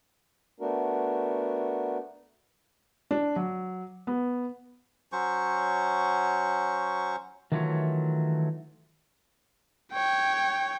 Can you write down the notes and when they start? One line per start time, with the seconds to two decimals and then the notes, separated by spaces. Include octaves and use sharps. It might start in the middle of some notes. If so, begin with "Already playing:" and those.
0.60 A3 B3 D4 F#4 A#4
3.11 D4
3.36 F#3
4.07 B3
5.12 F#3 C#4 C5 C#6
7.52 D#3 E3 F#3 A3 F4 C#5
9.92 C#5 G5